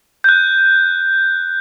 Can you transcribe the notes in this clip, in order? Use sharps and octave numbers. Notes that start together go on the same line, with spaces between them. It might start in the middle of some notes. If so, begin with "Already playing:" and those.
F#6 G6